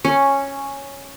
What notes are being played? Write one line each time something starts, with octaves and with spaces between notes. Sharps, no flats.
C#4